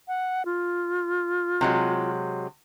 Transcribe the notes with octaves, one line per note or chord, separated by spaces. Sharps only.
F#5
F4
C3 F#3 G#3